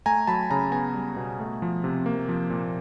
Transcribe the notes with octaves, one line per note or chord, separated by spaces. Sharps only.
A3 G#5 A#5
F#3 A5 B5
C#3 G#5 A#5
B3 G#5 A#5
G3
B2
A3
F3
C3
A#3
F3
A#2